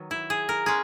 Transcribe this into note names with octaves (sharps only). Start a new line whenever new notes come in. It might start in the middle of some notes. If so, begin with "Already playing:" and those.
Already playing: D#3 F#3 B3
E4
G#4
A#4
G#3 C#4 G#4